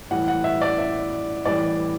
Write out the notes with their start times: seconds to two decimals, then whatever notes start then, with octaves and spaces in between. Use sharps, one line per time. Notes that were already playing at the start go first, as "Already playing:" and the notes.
0.11 A2 E3 G3 F#5
0.28 F#5
0.44 E5
0.61 D5
0.78 E5
1.45 A2 E3 G3 D5